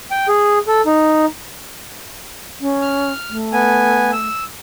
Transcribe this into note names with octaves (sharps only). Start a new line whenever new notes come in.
G5
G#4
A4
D#4
C#4
F6
A3
B3 G#5
E6